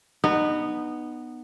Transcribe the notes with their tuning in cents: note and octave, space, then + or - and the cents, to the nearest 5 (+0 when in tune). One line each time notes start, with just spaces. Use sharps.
B3 +0 D#4 -25